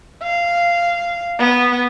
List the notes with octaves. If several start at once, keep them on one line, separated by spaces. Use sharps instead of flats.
F5
B3